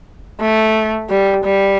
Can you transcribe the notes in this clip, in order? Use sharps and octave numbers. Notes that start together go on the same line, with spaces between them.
A3
G3
G3